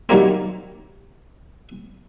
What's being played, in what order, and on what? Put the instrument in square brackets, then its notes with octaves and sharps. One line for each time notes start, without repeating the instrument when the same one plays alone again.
[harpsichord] D#3 F#3 G3 A#3 C4